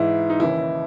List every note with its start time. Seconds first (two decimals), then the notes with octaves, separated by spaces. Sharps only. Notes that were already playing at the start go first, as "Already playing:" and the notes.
Already playing: G#2 E3 E4
0.30 D#4
0.39 D#2 C#3 E3 E4